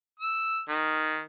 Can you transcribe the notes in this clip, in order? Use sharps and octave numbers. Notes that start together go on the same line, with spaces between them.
E6
D#3